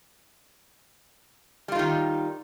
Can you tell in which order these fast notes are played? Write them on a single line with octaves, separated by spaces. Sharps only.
G3 F4 D#4 D#3